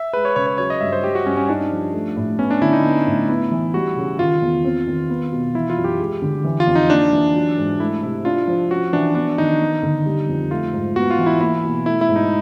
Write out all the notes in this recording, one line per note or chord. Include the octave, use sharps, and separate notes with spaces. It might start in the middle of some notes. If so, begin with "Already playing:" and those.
Already playing: E5
G#3 B4
C#5
C#3 C#5
C#5
F#3 C#5
D#5
G2 E5
C5
G3 G4
F#4
G2 C#4
C#4
D4 D#4
F3
A3
A2
B3 C#4
D4
D3 E4
D#4
B3
A2
B3 E4
E3
G3 F#4
C#3
D#3 F4
E2
C4
D#3
B3
B2
E3 E4
F4
F#2
G4
G#3
D3
E3
F4
F2
D#4
A#3 D4
E3
F#3
G#2
A3 E4
C3 E4
D4 F4
F3
C#4 F#4
E3 D4
B3 D4
D#3 D#4
B3
D3
G3
F2
A3 F4
G#2
B3 F#4
F4
E3
E4
A#3 E4
B2
A3 E4
E4
G#2
D#4